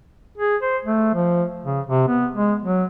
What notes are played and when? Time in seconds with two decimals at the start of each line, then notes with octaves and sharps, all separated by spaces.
0.38 G#4
0.62 C5
0.85 A3
1.15 F3
1.64 C#3
1.87 C3
2.08 B3
2.35 G#3
2.63 F#3